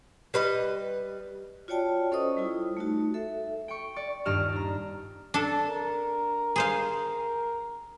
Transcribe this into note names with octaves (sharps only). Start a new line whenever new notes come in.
G3 B4 D#5
F4 F#4 C#5 D5 G5 A5
C#4 A4 C5 D#5 C#6 D#6
G3 E4 F4
A3 D#4 F#4
A4 E5
G5 C#6
D5 C#6
D#1 G2 G4 D#5 F6 E7
D4 A#5
D4 A4
A#4
G#4 C5 F5